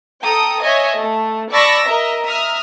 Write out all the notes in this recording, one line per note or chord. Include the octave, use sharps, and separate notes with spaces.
A4 G5 A#5 D#6
C#5 D#5 E5 G#5
A3
D5 A5 B5 C#6 E6 A#6
A#4 D#5 E5 A#5
E5 A#5 D#6 F6